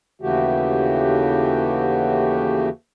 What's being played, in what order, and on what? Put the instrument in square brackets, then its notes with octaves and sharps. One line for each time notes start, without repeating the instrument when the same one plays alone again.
[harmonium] D#2 C#3 E3 A3 F#4 G4